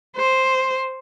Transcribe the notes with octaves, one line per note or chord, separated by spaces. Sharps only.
C5